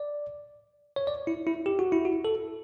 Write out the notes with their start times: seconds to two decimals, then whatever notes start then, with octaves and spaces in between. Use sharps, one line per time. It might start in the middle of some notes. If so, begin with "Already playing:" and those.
Already playing: D5
0.96 C#5
1.07 D5
1.27 E4
1.47 E4
1.66 G4
1.79 F#4
1.92 E4
2.05 F#4
2.25 A4